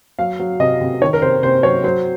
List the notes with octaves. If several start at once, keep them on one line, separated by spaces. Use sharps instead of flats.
F#3 F5
F#3
C3 D#5
C3
D#3 C#5
A#4
C3 C5
C3 C5
F#3 C#5
F#3 C5